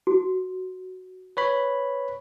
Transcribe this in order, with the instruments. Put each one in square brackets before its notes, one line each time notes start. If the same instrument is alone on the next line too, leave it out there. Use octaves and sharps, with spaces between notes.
[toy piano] F#4
[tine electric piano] B4 C#5 B5